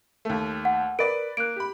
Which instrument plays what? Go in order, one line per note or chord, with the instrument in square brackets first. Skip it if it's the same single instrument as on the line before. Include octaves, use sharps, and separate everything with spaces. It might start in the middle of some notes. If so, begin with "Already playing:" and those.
[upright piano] D#2 A3
[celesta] F#5
[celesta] A#4 D7 [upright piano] B4 D5
[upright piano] A#3 [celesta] F#6 D7
[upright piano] G4 B5